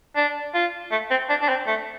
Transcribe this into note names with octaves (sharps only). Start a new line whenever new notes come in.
D4
F4
A3
C4
D4
D4
C4
A3